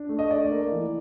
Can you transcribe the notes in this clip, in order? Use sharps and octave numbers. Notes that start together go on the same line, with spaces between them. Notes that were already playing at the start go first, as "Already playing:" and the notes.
Already playing: D4
A3
D#5
D4 D5
A#3
E3